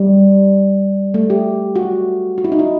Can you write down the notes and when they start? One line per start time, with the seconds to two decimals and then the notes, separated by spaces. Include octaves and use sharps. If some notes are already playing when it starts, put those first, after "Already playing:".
Already playing: G3
1.14 A3
1.30 G4
1.76 F#4
2.38 F#4
2.44 E4
2.52 D#4
2.59 E4